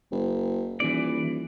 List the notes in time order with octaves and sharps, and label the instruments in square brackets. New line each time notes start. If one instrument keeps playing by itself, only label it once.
[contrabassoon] F#1
[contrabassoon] D#1 [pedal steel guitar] E3 D5